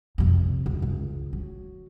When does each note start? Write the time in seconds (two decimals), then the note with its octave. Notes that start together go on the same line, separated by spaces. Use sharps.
0.18 F2 C3
0.66 C#2
0.82 C#2
1.33 F#3